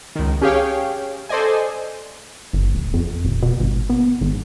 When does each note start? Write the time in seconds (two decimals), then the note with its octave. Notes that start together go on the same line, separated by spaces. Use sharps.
0.15 C#2 D#3
0.41 C#4 G4 G#4 C#5 F5 G5
1.29 A4 C5 D5 D#5 G#5
2.53 G1
2.75 D1
2.94 F2
3.25 D#1
3.42 B2
3.60 G#1
3.90 B3
4.21 G#1